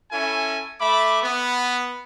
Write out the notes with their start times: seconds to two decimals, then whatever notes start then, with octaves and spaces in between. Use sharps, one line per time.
0.12 C#4 E4 A4 G#5
0.80 A3 E5 B5 D6
1.23 B3